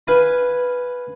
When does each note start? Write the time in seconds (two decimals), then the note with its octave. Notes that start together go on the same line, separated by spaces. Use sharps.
0.07 B4 F5 G#5 B5